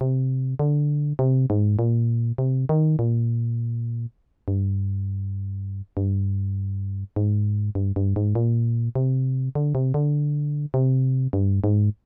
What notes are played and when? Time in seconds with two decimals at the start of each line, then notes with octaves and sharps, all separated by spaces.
0.01 C3
0.59 D3
1.19 C3
1.50 G#2
1.79 A#2
2.38 C3
2.69 D#3
2.99 A#2
4.48 G2
5.97 G2
7.16 G#2
7.75 G2
7.96 G2
8.16 G#2
8.35 A#2
8.95 C3
9.55 D3
9.75 C3
9.94 D3
10.74 C3
11.33 G2
11.64 G#2